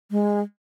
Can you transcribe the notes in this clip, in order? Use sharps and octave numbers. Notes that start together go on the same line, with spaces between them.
G#3